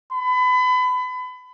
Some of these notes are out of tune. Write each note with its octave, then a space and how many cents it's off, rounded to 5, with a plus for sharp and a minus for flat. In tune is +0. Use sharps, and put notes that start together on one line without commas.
B5 +30